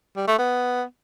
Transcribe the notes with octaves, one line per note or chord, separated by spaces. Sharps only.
G3
A3
B3